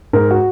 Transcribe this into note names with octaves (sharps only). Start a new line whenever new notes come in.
G#2 A#4
F#4